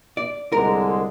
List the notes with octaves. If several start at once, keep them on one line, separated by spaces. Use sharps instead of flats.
D5
C2 D3 G#3 A#4